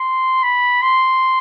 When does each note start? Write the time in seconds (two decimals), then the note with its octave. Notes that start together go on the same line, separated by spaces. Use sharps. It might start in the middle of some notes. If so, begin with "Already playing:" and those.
Already playing: C6
0.43 B5
0.82 C6